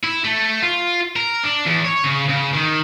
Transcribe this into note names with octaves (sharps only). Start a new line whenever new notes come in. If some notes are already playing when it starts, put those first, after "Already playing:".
E4
A3
F4
A#4
D4
E2
C#5
C#3
C#3
D#3